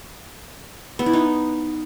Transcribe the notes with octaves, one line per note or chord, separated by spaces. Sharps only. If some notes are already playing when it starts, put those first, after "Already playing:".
B3
E4
D#4